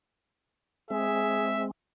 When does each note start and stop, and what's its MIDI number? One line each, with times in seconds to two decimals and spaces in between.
0.90 1.71 56
0.90 1.71 60
0.90 1.53 68
0.90 1.63 76